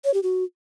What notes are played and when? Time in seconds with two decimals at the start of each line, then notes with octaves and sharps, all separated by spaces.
0.05 C#5
0.14 G4
0.23 F#4